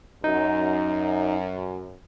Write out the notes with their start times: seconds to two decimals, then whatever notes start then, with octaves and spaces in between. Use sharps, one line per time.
0.24 F#2 D#4